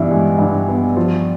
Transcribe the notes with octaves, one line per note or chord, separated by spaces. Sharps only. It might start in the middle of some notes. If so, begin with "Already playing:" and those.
Already playing: G2 E3 B3 E4
G#3
G2
B3
F3 F4